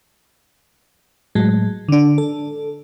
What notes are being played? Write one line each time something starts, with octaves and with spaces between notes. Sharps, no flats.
A2 F#3 G#3
D3 D4
A4